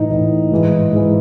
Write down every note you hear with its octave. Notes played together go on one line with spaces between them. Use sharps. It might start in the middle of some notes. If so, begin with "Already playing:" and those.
Already playing: A2 E3 D#4
A2 E3
G#2 E3
G#2 E3